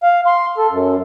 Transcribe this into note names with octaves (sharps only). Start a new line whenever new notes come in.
F5
C6
A4
F#2